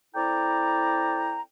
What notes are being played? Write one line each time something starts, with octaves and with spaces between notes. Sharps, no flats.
C4 E4 A4 D5 G5 A#5